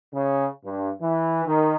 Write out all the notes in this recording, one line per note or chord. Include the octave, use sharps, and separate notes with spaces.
C#3
G2
E3
D#3